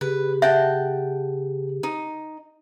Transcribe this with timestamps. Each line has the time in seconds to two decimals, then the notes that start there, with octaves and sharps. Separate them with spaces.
0.01 C#3 G4 G#4 B4
0.42 E5 F#5 G5 A5
1.83 D#4